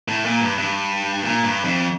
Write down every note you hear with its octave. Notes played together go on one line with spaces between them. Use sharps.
A2
A#2
G2
G2
A#2
G2
F2